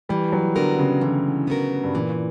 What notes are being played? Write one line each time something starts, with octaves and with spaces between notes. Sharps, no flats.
E3 G3
F#3
D3 B3 F#4 A#4
C#3
D3 E3
B3 F#4 A#4
G2
A#2 E3